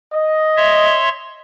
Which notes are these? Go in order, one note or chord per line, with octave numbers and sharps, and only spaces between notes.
D#5
C#5 E5 C6